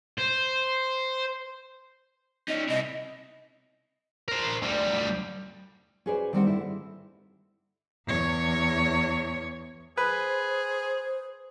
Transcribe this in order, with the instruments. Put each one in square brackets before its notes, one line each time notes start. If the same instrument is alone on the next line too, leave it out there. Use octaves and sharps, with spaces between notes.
[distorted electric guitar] C5
[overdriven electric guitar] C#4 D#4 [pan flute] D#5
[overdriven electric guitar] C3 E4 [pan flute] D#5
[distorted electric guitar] A#4 C5
D2 G3
[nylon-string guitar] C#4 F#4 G#4 B4 C5 D5
D#3 G3 C4 F#5
D3 E4
[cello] E2 C#5
[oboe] G#4 [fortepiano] B4 [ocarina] C5